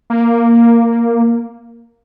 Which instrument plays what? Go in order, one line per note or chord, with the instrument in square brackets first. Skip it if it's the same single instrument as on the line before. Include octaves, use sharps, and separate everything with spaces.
[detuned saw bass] A#3